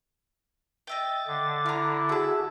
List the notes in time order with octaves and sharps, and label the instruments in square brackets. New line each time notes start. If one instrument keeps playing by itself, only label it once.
[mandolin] D#5 E5 G5 [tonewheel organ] A6
[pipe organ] D3
[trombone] E4 [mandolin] A#5 F6
[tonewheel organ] F#4 G#4 [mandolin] E5 A5